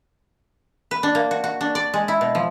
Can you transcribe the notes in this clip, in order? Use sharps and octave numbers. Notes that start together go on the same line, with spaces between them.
B4
D4
A#3
F#4
F#4
D4
D5
G#3
E4
B2
F3